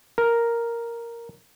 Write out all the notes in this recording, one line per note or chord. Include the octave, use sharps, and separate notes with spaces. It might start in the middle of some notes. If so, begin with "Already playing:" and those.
A#4